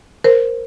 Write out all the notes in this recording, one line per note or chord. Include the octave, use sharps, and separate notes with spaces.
A#4 C5